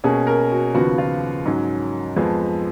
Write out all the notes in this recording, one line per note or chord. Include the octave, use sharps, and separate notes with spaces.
B2 A#3 C#4 G#4
A#4
F#4
D#2 C#3 F3 B3 F#4
F4
G#2 F#3 C#4
F2 F3 G#3 B3